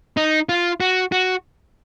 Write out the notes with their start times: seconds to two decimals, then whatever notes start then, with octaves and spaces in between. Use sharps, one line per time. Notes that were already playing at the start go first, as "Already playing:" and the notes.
0.17 D#4
0.49 F4
0.80 F#4
1.12 F#4